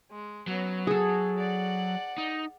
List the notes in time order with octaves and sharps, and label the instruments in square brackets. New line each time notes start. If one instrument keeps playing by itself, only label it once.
[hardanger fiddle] G#3
[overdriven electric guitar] F#3 [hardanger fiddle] B3 C#4
[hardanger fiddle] F#4 [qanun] G#4 A4
[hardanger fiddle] D5 F#5
[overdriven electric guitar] D#4